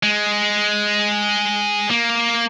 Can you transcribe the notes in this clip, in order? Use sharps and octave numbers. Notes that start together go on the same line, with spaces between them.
G#3
A#3